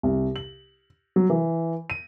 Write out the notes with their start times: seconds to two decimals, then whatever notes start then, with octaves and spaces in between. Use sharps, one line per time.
0.03 C2
0.36 F#7
1.16 F#3
1.30 E3
1.90 D#7